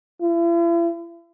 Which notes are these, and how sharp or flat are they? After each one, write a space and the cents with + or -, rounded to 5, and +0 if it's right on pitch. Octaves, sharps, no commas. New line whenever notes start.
E4 +45